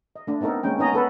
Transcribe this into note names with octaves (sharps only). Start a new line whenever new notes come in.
D#5
A3 D4
B3 C4 D#4 A4 A#4
G#3 A#3 C#4 G5
B3 C#4 D#4 D#5 G#5 A#5
B3 A4 B4